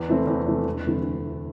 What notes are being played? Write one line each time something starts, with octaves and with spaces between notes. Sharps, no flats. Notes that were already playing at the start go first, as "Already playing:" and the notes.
Already playing: E2
C3 E3 A3 C4
E2
C3 E3 A3 C4
E1
D2 C3 E3